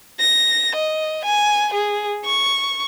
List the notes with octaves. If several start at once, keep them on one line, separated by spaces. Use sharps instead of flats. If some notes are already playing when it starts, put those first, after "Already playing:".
A#6
D#5
G#5
G#4
C#6